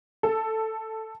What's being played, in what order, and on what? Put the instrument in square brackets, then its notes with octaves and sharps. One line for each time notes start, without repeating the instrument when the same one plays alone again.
[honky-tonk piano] A4